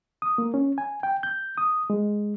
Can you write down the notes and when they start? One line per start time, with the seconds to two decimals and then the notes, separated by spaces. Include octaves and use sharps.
0.22 D#6
0.38 A#3
0.54 C#4
0.78 G#5
1.03 G5
1.23 G6
1.58 D#6
1.90 G#3